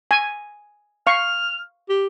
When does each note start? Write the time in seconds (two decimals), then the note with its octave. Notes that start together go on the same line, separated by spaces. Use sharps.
0.11 G#5
1.07 F5 C#6 F6
1.89 G4